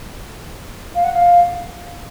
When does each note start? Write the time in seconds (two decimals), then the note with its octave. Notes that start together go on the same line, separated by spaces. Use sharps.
0.95 F5
1.04 F#5
1.13 F5